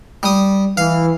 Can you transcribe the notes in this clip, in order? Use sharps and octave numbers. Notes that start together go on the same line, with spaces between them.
G3 D#6
E3 F5